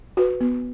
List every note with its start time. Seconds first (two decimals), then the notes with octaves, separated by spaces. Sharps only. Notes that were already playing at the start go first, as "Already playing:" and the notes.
0.17 F#4 B4
0.41 B3